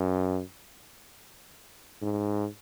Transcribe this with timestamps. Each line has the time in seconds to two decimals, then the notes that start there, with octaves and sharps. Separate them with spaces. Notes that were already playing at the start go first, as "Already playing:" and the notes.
Already playing: F#2
2.02 G#2